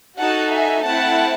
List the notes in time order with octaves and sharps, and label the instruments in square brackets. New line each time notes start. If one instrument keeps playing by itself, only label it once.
[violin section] D#4 F#4 A4 F#5 A5
E5 G#5
A3 C4 E4 F#5 A5